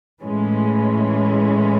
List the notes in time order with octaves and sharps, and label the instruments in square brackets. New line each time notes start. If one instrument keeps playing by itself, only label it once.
[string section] A2 E3 G#3 C#4